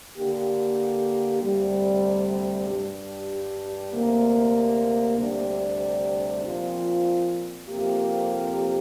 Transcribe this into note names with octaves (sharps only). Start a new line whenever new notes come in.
D3 A#3 G4
D2 C3 G3
G2 G3 D4 G4
D2 C3 A#3
D2 C3 G3 D4 G4
A#2 F3 C4 F4
F2 C3 A#3 G4